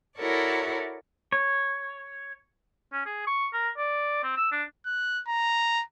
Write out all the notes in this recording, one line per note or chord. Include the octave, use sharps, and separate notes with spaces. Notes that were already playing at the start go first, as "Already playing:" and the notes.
E4 F#4 A4 A#4 C#5 D5
C#5
C#4
G#4
C#6
A#4
D5
C4
E6
D4
F#6
A#5